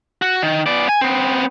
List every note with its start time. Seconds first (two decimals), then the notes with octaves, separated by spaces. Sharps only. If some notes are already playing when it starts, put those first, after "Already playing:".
0.22 F#4
0.42 D#3
0.66 B3 D5
0.89 G#5
1.01 B3 C4